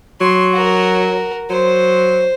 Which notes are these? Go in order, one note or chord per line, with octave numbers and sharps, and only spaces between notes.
F#3 C6
F#4 A#4
F#3 C5